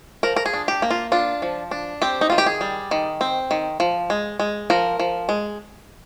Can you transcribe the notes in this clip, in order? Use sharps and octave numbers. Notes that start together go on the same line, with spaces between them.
F3 A#4
A#4
G#4
D4
G4
A#3
F4
D4 F4
F3
D4
C4 G4
D#4
D#3 F4
G4
G#4
G3
D#3
C4
D#3
F3
G#3
G#3
F3 A#4
F3
G#3